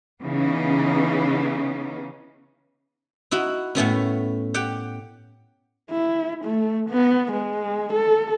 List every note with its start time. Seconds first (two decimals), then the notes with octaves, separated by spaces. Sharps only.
0.21 C#3 E3 B3 C#4 D#4
3.31 D#4 E4 F#4
3.75 A2 A3 B3 C#4
4.54 G4 F#5 G5
5.90 E4
6.45 A3
6.90 B3
7.32 G#3
7.93 A4